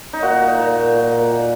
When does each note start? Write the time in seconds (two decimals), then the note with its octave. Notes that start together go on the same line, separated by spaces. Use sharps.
0.13 D#4
0.22 A#2 F#4
0.41 A#2
0.59 A#2
0.76 A#2
0.95 A#2
1.13 A#2
1.31 A#2